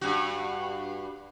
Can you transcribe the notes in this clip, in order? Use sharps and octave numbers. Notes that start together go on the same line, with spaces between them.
G2 F#4